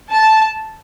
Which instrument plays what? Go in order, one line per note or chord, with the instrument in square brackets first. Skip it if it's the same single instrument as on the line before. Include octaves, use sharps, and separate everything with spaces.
[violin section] A5